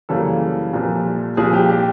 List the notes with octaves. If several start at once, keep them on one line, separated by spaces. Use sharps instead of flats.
F#2 C#3 E3 G3 A#3 A4
C2 A#2 F3
C2 A#2 F3 G#4
G4
G4